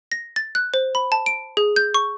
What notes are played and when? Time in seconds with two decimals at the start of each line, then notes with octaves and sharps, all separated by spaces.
0.12 A#6
0.36 A6
0.55 F#6
0.74 C5
0.95 B5
1.12 A5
1.26 D7
1.57 G#4
1.76 G6
1.94 C#6